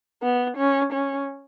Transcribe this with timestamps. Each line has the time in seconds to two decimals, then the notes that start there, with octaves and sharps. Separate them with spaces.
0.23 B3
0.57 C#4
0.93 C#4